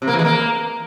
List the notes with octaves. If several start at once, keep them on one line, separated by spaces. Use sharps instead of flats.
C3
A#3
E3
G#3
A#3